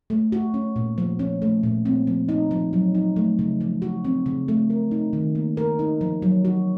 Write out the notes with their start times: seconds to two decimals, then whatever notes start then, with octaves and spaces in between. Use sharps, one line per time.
0.10 A3
0.32 F#4
0.54 C#4
0.76 A#2
0.98 F3
1.19 C#4
1.42 A3
1.63 A#2
1.85 C4
2.07 F3
2.29 D#4
2.51 F3
2.73 F#3
2.95 D#4
3.16 A3
3.39 C#3
3.61 F3
3.82 F#4
4.05 C4
4.26 C#3
4.48 A3
4.70 A#4
4.91 D#4
5.13 D#3
5.35 A#3
5.57 A#4
5.79 D#4
6.01 F3
6.22 F#3
6.45 F#4